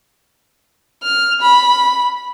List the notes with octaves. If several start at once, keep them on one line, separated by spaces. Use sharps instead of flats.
F6
B5